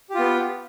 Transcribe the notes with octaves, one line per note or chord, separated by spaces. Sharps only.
B3 F4 G4